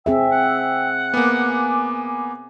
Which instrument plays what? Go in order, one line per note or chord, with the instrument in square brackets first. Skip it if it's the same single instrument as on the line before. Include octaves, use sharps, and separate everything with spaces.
[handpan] C4 G#4 E5 [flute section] G5 E6
[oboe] F#5
[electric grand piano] A#3 B3 [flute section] G#5 D6